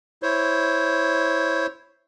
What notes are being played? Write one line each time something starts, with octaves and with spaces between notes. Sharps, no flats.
E4 C5 C#5